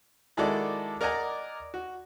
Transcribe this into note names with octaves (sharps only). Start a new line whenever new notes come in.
D#3 G#3 E4 F#4 A4 D5
A#4 D5 D#5 F#5 G#5 A#5
F#4